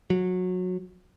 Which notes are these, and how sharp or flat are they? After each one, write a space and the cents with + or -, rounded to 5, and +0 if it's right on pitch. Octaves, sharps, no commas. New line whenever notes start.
F#3 -20